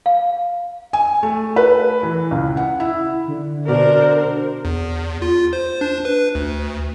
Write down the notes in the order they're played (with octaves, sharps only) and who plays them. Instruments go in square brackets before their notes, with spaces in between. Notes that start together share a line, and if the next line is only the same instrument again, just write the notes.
[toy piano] F5
[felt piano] G#5
A3
B4
E3
C#2
F#5
E4
[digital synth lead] D3
[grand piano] B2 D5 [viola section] D4 A#4 C5
[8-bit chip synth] E2
F4
C5
D4
B4
D2